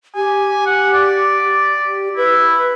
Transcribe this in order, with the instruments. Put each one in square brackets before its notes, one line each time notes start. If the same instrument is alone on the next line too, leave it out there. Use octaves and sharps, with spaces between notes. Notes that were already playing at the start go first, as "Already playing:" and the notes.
[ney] G4 [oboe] G#5
[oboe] F#5
D5
[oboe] E4 [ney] B4